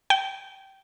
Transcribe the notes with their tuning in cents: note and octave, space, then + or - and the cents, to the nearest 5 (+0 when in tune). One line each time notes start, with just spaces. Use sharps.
G5 -20